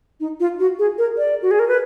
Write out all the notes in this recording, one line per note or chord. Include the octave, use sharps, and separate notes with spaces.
D#4
F4
F#4
G#4
A#4
D5
F#4
G#4
A#4
B4